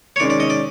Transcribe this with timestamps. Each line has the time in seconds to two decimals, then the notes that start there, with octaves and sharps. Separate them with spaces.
0.16 C#5
0.20 D#3 G#3 C#4 D5
0.30 D5
0.40 D#5
0.50 D5